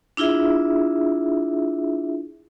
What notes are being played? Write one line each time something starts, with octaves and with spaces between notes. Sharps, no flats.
D4 E4 F4 G#4 E5